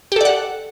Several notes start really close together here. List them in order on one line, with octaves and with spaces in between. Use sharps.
G4 A4 D5 F#5